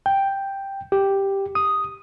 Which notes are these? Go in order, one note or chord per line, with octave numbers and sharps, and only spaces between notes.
G5
G4
D#6